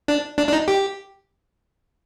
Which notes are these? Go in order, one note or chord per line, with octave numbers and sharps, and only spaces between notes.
D4
D4
D4
D#4
G4